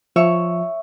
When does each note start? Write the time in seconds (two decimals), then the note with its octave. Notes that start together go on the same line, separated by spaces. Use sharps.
0.16 F3 C#5 E5 C#6